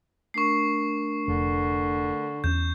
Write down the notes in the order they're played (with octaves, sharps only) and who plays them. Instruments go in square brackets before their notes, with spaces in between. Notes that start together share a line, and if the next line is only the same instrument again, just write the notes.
[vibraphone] A3 D4 A#4 [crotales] C#6 C7
[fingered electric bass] F1 [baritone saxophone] D3
[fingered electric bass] E2 C#4 [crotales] G6